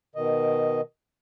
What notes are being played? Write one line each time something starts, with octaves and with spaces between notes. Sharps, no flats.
B2 D#3 D#5